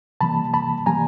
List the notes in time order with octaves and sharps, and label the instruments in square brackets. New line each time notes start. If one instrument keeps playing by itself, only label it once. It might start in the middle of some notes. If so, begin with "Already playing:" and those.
[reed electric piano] C3 E3 G3 A#3 A5 B5
A5 B5
C3 E3 G3 A#3 G#5 A#5